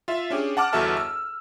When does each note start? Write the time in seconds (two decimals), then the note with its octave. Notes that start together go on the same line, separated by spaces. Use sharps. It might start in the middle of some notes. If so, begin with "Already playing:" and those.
0.08 F4 E5
0.30 C#4 D4 G4 G#4
0.57 F#5 A5 D6 F6
0.73 G1 E2 F#4 A4 E5 A5
0.97 E6